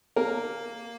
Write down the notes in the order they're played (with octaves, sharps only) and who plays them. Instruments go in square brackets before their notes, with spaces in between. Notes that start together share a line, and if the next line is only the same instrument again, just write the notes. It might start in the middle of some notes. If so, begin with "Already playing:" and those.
[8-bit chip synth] A#3 [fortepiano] A#4